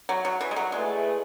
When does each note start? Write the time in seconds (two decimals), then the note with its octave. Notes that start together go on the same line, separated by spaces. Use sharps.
0.09 F#3
0.25 F#3
0.41 E3
0.51 G#3
0.56 F#3
0.71 G#3 A3 E4 G#4 B4 D5